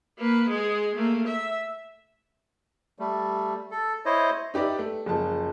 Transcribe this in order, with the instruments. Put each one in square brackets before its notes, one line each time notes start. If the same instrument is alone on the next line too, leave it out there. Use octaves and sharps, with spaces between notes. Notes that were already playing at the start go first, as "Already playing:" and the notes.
[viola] A#3 B4
G#3 G#4
A3 A#3
E5
[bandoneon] G3 A3
A4
E4 C5 C#5 D#5
[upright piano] D#4 G4 B4 D5 E5
A3
F#1 F3 A5